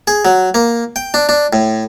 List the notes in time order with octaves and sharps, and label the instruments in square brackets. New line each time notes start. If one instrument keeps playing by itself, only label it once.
[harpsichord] G#4
F#3
A#3
G5
D4
D4
A2